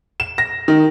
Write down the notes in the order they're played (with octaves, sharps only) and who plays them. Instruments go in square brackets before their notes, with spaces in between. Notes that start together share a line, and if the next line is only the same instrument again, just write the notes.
[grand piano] E7
A#6
D#3